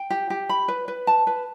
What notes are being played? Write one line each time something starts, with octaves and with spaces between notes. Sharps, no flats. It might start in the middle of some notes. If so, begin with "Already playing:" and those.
Already playing: G5
G4
G4
B5
B4
B4
A5
B4